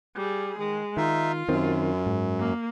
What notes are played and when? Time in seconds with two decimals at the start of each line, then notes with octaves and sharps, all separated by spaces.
0.16 G3 G#4
0.58 D#3 G#3
0.97 D#3 D#4 F4 E5
1.49 F#2 D#3 C4
2.06 G#2
2.39 A#3